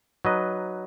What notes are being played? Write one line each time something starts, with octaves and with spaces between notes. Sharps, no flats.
F#3 D#4 B4 D#5